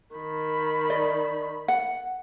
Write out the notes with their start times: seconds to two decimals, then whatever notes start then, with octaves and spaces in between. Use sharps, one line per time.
0.16 D#3 B5
0.90 D5 D#5
1.68 F#5